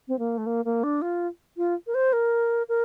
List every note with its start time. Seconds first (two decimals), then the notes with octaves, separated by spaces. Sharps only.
0.08 C4
0.19 A#3
0.38 A3
0.46 A#3
0.65 A#3
0.83 D4
1.02 F4
1.57 F4
1.87 A#4
1.94 C5
2.13 A#4
2.69 A#4